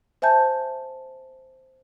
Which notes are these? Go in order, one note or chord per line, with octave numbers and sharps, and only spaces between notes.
C5 E5 G#5 A5 G6